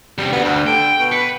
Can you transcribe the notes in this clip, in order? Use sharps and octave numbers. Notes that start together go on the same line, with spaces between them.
E2 C3 G3
D2 B3
G2 F#5
D3 G5 D7
B2 D7
B4 C#7